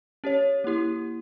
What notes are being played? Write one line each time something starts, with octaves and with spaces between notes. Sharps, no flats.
C#4 G4 C#5
A#3 E4 G4